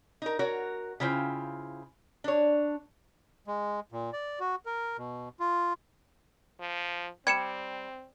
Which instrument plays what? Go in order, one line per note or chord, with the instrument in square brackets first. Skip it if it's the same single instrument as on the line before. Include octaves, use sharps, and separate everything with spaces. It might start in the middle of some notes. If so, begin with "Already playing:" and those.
[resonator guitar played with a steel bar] D#4 A#4
F#4 A#4 C#5
C#3 C#4 E4 F4 C5 G5
D4 C#5
[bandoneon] G#3
A#2
D5
F#4
A#4
B2
F4
[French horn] F3
[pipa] G3 [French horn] C4 [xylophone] G#6 C#7 E7